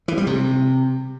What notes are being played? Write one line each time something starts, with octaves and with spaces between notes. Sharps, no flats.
E3
G3
C3